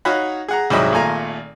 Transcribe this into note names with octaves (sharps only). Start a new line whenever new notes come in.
D#4 F#4 C#5 F5 F#5 B5
G#4 F#5 A#5
C2 G#2 F#3 D#5 E5 B5
G#1 A#2 A3 G#5 A#5